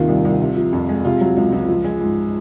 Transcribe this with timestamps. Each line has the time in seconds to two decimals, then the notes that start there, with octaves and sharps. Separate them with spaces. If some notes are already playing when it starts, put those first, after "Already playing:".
Already playing: D#2 C3 D#3 F4
0.08 C2
0.25 C2
0.41 C3
0.57 F3
0.73 F2
0.89 G#3
1.05 C3 F4
1.21 F#3
1.37 C#2
1.52 C#2
1.69 F3
1.84 G#3
2.01 G#2